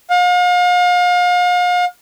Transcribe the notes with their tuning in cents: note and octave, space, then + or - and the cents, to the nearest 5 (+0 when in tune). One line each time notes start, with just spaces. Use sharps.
F5 +40